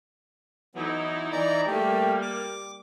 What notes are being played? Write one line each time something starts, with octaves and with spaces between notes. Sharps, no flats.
E3 F#3 B3 D#4 E4
E3 D5 A#5
G3 A3 A#3 G4
D6